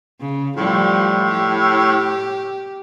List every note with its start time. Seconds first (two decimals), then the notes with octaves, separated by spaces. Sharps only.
0.21 C#3
0.57 A2 F3 G3
1.31 G4